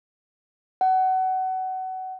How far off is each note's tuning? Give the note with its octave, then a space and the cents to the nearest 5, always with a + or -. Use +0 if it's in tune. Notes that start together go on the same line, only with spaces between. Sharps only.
F#5 +25